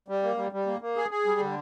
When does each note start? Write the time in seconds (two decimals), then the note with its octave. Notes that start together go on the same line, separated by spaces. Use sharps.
0.08 G3
0.23 A#3
0.37 G3
0.52 G3
0.67 A#3
0.81 A#3
0.96 G#4
1.11 G#4
1.25 G3
1.40 D3